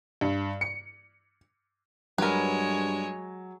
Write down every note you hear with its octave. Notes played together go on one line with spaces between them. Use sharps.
G2
C#7
G2 F#3 G#3 A#4 B4 C#5